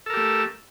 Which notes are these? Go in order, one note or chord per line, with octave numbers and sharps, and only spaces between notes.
A3 G4 A4 A#4